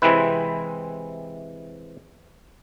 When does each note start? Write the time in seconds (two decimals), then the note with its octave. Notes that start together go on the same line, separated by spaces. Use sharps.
0.02 C3 E3 G#3 C4 E4 B4